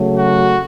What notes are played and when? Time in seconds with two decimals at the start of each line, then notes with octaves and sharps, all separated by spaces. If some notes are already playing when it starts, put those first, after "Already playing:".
Already playing: C#3 F#3 A3
0.17 F#4